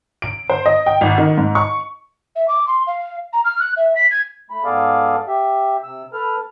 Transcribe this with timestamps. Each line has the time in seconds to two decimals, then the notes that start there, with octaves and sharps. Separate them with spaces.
0.22 D7
0.50 C5
0.66 D#5
0.86 G5
1.01 G#1
1.18 D#3
1.38 G#2
1.55 C#6
2.35 E5
2.48 D6
2.67 C6
2.87 F5
3.33 A#5
3.44 F6
3.59 F#6
3.76 E5
3.95 B6
4.11 G#6
4.50 A3 B5
4.64 G#2 B3 G#4 A4 D5 F5
5.27 G4 E5
5.83 C3 E6
6.13 A4 B4 F6